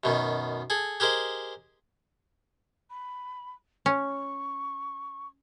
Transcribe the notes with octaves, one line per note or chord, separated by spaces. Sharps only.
F#2 B2 D#3
G#4 A4
G4 G#4 A#4 C5 D#5
B5
C#4 C#6